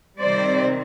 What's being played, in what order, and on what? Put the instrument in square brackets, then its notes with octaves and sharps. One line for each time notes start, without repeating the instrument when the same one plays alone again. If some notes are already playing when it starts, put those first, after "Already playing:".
[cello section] C3 D#3 G3 C4 C5 D5